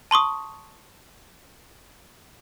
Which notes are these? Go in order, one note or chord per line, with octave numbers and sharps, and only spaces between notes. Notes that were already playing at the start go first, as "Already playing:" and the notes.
A5 C6 C#6 D#6